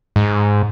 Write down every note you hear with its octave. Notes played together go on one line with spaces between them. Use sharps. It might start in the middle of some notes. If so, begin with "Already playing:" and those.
G#2